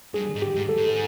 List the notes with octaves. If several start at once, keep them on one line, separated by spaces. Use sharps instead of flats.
G2 G#4
G#2
G4
G#2
A4
G#2